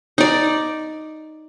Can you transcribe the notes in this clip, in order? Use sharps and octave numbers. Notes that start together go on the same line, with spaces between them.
D#4 D5